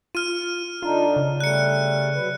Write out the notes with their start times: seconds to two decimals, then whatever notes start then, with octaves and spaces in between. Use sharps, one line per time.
0.15 F4 F6 D#7
0.82 D3 D4 D#4 F4
1.16 C#3
1.40 G3 A3 F#6 C#7
2.15 F#3 B4